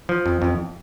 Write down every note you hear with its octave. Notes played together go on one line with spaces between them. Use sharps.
F3
F2
F2